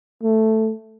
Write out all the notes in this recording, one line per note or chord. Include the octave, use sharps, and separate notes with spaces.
A3